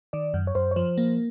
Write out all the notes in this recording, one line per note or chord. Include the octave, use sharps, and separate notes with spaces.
D#3 D5
F#2
C#5
F#2 C5
C#5
F3 C5
A#3